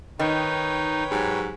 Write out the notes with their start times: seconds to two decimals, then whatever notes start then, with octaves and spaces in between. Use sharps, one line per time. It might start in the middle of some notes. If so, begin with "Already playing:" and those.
0.19 D#3 D#4 B4 C#5 G5
1.11 G#2 F#3 G4